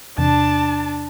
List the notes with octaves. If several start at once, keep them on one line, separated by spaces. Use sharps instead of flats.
E2 C3 D4 A5